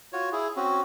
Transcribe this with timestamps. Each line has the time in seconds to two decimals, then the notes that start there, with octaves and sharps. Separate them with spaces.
0.13 F4 F#4 C#5
0.32 E4 G#4
0.56 C4 C#4 F#4